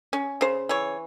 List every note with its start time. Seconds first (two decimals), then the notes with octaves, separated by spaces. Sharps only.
0.13 C#4
0.41 C#3 C5
0.69 E3 C#5